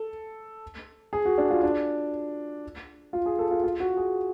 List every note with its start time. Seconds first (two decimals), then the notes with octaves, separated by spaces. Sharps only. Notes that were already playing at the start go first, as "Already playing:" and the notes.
Already playing: A4
1.13 G#4
1.25 F#4
1.38 D4
1.50 F4
1.63 D4
3.13 F4
3.26 G#4
3.39 A4
3.51 F4
3.64 F4
3.80 F#4
3.97 G#4